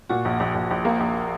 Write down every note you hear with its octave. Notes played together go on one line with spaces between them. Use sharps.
A#2 F#4
A#1
A#1
A#1
A#1
A#3
A#1